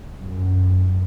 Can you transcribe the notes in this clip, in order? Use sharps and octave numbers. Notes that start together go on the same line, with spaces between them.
F#2